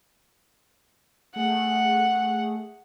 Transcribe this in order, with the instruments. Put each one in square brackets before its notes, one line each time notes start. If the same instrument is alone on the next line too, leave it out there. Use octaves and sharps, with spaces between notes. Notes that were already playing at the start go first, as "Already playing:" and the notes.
[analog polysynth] A3 G#4 [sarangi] F#5